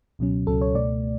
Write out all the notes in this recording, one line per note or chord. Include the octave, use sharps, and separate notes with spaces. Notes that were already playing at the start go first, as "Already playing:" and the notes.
C#2 B2 F#3 C#4
C#2 B2 F#3 C#4 A4
C#5
C#2 B2 A3 D5